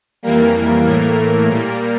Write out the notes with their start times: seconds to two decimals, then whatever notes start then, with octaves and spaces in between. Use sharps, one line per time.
0.23 F2 E3 G3 A#3 A#4
0.85 A2 E3 A3 A#3 A#4
1.48 A#2 G3